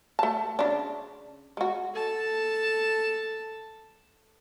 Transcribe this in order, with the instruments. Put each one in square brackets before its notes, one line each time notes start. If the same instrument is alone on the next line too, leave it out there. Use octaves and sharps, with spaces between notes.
[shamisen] A3 A5
C#3 D4
G#3 F#4
[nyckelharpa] A4 A5